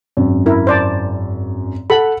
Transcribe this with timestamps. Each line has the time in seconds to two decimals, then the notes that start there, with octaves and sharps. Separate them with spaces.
0.17 G#1 F#2
0.46 E4 A#4
0.67 C5 D5 A5
1.90 A4 F#5 B5